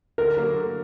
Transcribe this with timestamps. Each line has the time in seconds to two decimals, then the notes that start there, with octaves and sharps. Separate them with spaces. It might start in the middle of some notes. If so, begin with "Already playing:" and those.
0.18 D3 A#4
0.37 F#3 A#3
0.56 D3